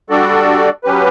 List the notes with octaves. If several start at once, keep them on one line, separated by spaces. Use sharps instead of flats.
G3 D4 F#4 A4 D5
F#3 C#4 G4 B4